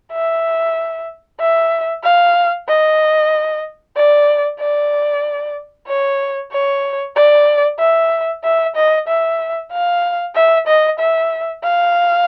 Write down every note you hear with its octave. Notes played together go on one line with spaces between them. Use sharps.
E5
E5
F5
D#5
D5
D5
C#5
C#5
D5
E5
E5
D#5
E5
F5
E5
D#5
E5
F5